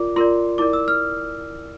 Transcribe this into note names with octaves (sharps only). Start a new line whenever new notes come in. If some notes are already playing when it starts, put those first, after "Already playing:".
Already playing: F4 A#4 D5 D6
F4 A#4 D5 C6
E4 A#4 D5 D6
E6
F6